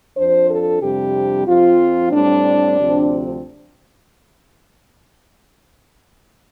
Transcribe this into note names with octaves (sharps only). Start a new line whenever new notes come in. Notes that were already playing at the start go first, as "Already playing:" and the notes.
F2 F3 D4 C5
A4
F2 C3 G3 D4 G4
F2 F3 C4 F4
A2 G3 C4 D4
D2 C3 F3 C4